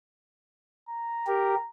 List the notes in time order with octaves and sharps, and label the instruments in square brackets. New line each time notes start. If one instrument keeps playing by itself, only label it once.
[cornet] A#5
[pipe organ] G4 A#4